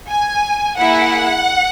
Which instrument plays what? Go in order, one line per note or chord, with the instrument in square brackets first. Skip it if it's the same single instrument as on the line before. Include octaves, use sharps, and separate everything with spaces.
[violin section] G#5
A#3 E4 G#4 F#5